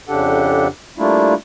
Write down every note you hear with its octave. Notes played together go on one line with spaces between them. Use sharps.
F2 C#3 D4 G4 A4 F#5
G3 A3 A#3 D4 E4 F4